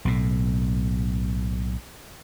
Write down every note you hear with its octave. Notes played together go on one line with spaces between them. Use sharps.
B1 A2